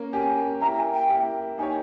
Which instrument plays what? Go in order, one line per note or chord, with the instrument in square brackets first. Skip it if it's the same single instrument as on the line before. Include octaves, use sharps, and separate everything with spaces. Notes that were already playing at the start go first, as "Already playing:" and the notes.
Already playing: [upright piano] A#3 C#4
[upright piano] A#3 C#4 G4 [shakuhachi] G#5
[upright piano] A#3 E4 G4 [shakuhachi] A#5
[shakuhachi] G#5
G5
[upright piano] A#3 E4 G4
[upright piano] A#3 D#4 G4 C#5 [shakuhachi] G#5